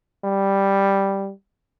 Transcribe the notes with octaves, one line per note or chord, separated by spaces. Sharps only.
G3